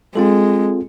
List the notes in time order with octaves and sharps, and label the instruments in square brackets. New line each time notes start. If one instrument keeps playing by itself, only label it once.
[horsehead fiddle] G#3 [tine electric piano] C4 F4 A4